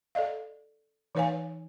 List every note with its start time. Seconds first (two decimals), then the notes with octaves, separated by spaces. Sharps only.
0.15 A4 D5 D#5 F5
1.15 E3 D#4 B4 C#5 F5 G#5